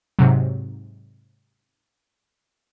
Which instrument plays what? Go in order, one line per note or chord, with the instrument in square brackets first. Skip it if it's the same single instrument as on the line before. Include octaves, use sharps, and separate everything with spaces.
[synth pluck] G#2 C3 F#3